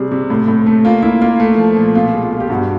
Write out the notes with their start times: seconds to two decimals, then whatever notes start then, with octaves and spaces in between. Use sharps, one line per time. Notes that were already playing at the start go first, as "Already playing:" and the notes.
Already playing: C3 G3 G#4
0.11 C3
0.30 A2
0.48 A2
0.66 A3
0.85 A#3 F4
1.03 A#3 E4
1.22 A#3 F4
1.40 A3
1.58 F3
1.77 A#2
1.95 B2 F4
2.13 G#3
2.23 F4
2.32 G#3
2.40 G4
2.50 G2 F#4